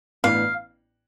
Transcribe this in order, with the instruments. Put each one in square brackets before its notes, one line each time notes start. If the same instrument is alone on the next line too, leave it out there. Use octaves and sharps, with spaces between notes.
[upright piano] A1 A2 E3 B3 D4 [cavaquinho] F5